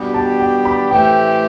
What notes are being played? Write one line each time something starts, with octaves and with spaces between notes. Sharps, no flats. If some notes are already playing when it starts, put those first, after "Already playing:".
Already playing: B2 G3 B3 D4 G4
A5
G5
B5
A2 E3 A3 C4 G4 G5